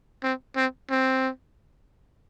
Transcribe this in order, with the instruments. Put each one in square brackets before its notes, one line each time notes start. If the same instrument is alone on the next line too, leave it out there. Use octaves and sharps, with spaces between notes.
[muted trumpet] C4
C4
C4